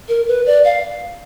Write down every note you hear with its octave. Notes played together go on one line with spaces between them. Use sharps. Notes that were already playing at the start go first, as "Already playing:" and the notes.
A#4
B4
D5
F5